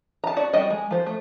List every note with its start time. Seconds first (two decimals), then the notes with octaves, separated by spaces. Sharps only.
0.24 A5 A#5
0.37 F#4 D5
0.53 G3 F#4 D#5
0.70 G#3
0.91 F3 C5
1.06 A3